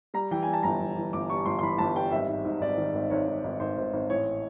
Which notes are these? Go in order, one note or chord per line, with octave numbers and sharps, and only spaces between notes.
G3 A#5
E3 G5
G3 G#5
A5
G1 A#5
G1
E3
G1 D6
G3 C#6
G1 C6
C6
E3 B5
G1 A5
G3 G5
G#1 E5
G#2
G#2
G#1 D5
D#3
G#1
G#1 C#5
G#1
G#1
G#1 C5
G#1
G#1
A1 C#5